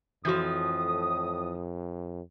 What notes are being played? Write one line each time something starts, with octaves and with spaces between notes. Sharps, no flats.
F2 A2 E3 F3 F#4 D#6 G6